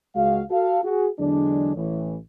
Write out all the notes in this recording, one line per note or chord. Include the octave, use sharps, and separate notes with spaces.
C#2 G#3 F#4 F5
F#4 A4 F5
F#4 G#4
E2 D3 F#3 G#3 D4
A1 A2 E3